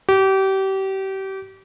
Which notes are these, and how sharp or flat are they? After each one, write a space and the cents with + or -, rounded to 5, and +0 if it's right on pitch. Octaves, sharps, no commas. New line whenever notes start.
G4 -30